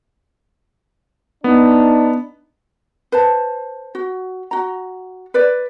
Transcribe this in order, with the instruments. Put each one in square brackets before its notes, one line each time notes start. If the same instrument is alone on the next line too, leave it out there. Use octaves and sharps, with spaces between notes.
[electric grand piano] B3 [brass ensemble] D4 D#4
[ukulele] B4 C5 A5
F#4
F#4 A#5
B4 D5